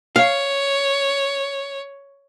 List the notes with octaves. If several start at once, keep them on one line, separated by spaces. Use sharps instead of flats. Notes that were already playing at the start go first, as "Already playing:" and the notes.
C#5 F5